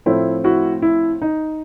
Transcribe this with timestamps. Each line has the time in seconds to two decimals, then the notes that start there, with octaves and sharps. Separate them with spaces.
0.06 A2 F3 A3 C4 E4
0.44 E4 F#4
0.82 E4
1.22 D#4